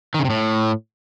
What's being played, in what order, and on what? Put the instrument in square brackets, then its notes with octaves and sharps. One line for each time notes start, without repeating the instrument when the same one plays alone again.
[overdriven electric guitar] D#3
C#3
C3
A2